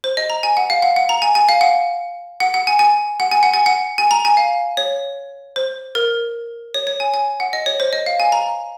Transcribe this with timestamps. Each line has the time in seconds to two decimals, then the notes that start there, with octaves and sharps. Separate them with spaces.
0.04 C5
0.17 D#5
0.30 A#5
0.43 G#5
0.57 F#5
0.70 F5
0.82 F#5
0.96 F#5
1.09 A#5
1.22 G#5
1.35 G#5
1.49 F5
1.61 F#5
2.40 F#5
2.54 F#5
2.67 G#5
2.79 G#5
3.20 F#5
3.31 G#5
3.43 F#5
3.54 G#5
3.66 F#5
3.98 G#5
4.11 A#5
4.25 G#5
4.37 F5
4.77 C#5
5.56 C5
5.95 A#4
6.74 C#5
6.87 C#5
7.00 G#5
7.14 G#5
7.40 F#5
7.53 D#5
7.66 C#5
7.80 C5
7.93 D#5
8.06 F5
8.20 G#5
8.32 A#5